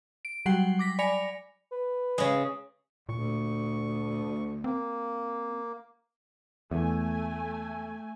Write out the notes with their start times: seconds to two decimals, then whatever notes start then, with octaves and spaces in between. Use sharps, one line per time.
0.25 D7
0.46 F#3 G3 F#5 G5 C7
0.79 D6 A#6 B6
0.99 D5 G#5 B5 A#6 C#7 F7
1.71 B4
2.18 C#3 G#3
3.09 D2 A#2 C#6
4.64 A#3 C4
6.71 E2 A3 G#5